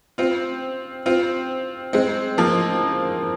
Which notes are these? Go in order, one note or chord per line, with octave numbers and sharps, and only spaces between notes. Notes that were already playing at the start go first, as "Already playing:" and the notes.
C4 F4
C4 F4
G#3 C4
F3 A#3